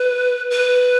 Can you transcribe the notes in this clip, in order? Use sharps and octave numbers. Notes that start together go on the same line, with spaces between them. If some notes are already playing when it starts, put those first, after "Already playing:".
Already playing: B4
B4